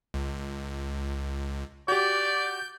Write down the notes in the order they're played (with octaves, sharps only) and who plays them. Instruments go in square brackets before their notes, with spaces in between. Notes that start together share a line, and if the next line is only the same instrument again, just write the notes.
[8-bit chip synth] C#2
[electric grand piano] F#4 G4 [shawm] D5 [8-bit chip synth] G6